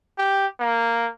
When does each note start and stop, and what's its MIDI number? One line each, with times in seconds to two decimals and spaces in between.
0.18 0.47 67
0.60 1.09 58